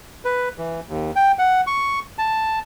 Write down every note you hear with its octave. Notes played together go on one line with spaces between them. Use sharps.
B4
E3
D#2
G5
F#5
C#6
A5